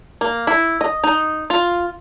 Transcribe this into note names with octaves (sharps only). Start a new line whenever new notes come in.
A#3
E4
D#5
D#4
F4